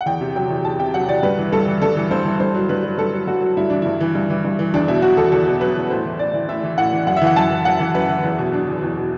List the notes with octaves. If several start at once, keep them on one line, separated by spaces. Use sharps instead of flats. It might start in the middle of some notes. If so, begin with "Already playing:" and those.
F#5
E2 G5
C3
F#3 G5
E2
E2 A5
C3 G5
F#3 F#5
E2 D5
G2 B4
E3
G2 A4
E3
G2 A4
E3
G2 C5
E3
G2 C5
F#3
G2 B4
F#3
G2 A4
F#3
G2 F#4
F#3
G2 E4
E3 D4
G2 E4
E3
G2
E3
G2
E3
E2 D4
B2 E4
F#3 F#4
E2 A4
E2 A4
B2
F#3 B4
E2
A2 C5
E3
A2 D5
E3
A2 E5
E3
A2 F#5
E3
F#2 F#5
E5
E3 F#5
F#2 A5
E3
F#2 F#5
E3
F#2 B4
E3
E2
B2
F#3 D4
E2
E2
B2